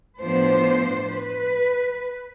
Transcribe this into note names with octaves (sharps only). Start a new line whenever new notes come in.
A2 F3 B3 D4 C5
B4